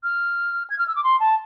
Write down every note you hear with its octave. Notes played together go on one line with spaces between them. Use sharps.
F6
G#6
F6
E6
D6
C6
A5